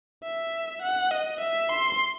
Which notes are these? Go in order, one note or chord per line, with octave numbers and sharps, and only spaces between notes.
E5
F#5
D#5
E5
C6